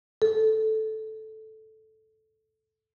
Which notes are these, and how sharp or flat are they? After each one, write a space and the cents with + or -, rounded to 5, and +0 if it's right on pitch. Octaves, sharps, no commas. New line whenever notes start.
A4 -10